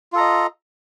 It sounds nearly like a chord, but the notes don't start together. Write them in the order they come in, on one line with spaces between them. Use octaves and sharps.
F4 A4 A#5 D#5